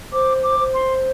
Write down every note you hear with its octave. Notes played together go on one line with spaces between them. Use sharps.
C5 D6
D6
C5
C6